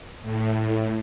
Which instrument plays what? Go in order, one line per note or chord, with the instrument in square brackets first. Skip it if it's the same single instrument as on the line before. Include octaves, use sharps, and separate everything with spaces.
[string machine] A2